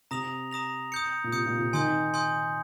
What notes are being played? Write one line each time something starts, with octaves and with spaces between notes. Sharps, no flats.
C3 A#5 D#6 A#6 F7
A#5 D#6 A#6 F7
D#6 G6 C#7
A#2
C3 D#6 G6 C#7
A#2
C3
D#3 G#5 C6 D#6 G6
G#5 C6 D#6 G6